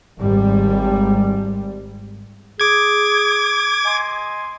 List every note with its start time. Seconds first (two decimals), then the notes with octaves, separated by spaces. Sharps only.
0.18 G#1 G3
2.60 G#4 D6 G#6
3.85 D#5 G#5 C6